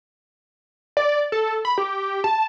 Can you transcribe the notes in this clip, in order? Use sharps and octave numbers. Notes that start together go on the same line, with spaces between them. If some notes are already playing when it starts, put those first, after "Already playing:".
D5
A4
B5
G4
A5